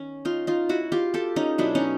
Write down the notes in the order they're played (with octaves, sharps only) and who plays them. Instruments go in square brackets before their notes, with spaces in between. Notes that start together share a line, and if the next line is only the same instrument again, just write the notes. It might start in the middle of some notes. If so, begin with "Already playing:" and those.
Already playing: [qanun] D#3 C#4
D#4 F4
D#4 F4
E4 F#4
F4 G4
G4 A4
C#4 D#4
B2 F#3 B3 D4 E4
C#4 D#4